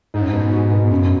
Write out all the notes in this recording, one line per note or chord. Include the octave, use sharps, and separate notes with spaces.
G#2 D#4
F#2
G#2 B2
F#4
B2
G#2
F#2 C#3